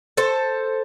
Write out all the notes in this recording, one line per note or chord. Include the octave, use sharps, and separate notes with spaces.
A4 C5